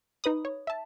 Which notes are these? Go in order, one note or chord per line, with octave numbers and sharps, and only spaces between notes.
D#4 B4 B5 D#6
C#5
E5 A5